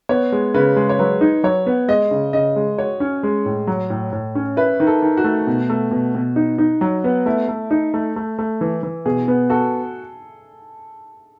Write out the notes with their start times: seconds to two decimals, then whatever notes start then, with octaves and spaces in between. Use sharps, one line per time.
0.09 B3 C#5
0.32 G#3
0.54 C#3 B4
0.76 G#3
0.89 C#5
0.99 F#3 B4
1.21 D#4
1.44 F#3 C#5
1.66 B3
1.88 G#3 D#5
2.11 C#3
2.33 C#3 D#5
2.56 G#3
2.78 F#4 C#5
3.00 C#4
3.23 G#3
3.46 A2
3.67 F#3
3.90 A2
4.12 A2
4.35 C#4
4.57 E4 B4
4.80 D#3
4.87 A4
5.02 D#3
5.17 F#4
5.24 A3
5.47 B2
5.70 A3
5.91 B2
6.15 B2
6.36 D#4
6.58 D#4
6.81 F#3
7.04 B3
7.26 A3 E4
7.48 A3
7.71 D#4
7.94 A3
8.16 A3
8.39 A3
8.61 E3
8.83 E3
9.06 B2 G#4
9.28 B3
9.50 F#4 A4